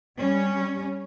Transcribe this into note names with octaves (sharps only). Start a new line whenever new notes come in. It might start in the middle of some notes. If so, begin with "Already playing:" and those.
G3 C#4